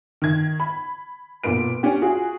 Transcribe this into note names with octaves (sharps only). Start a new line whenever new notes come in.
D#3 G#6
B5
B1 A#2 A#3 B3 D7
C#4 D4 G4
F4 F#4 G#4